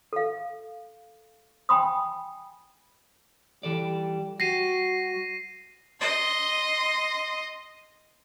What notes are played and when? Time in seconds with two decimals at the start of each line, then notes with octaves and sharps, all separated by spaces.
0.13 A4 F5
1.69 G5 G#5 B5 C6 D#6
3.63 E3 G3 A4 D5
4.40 G3 F#4 G4 A#6 C7 D#7
6.00 D#5 C6